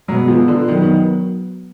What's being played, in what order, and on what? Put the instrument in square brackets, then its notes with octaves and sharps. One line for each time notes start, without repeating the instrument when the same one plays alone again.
[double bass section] B2 G#3 B3 [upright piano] F#3
[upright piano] F3
D3
[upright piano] D#3 [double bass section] F#3 B3
[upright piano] D#3